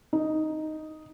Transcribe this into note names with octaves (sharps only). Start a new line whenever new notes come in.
D#4